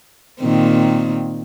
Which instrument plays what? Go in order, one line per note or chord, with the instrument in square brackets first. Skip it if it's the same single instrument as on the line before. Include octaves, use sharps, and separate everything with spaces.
[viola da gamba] A#2 D#3 C4